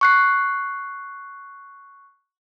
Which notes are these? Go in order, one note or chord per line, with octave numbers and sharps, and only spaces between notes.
C#6 F#6 C7